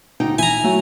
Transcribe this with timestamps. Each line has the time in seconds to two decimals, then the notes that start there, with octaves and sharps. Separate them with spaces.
0.20 D2 D#4 G5
0.39 E4 G#5 A#5
0.63 F#3 A3 F#4